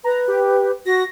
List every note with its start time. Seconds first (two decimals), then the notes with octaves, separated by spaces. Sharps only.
0.04 B4 A#5
0.28 G4
0.86 F#4 A#6